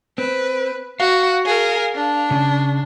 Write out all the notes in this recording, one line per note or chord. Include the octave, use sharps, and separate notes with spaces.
C4 B4
F#4 F5
G#4 A#4
D4
C#3 C#4